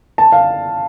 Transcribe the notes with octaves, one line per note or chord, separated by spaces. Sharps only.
A5
F5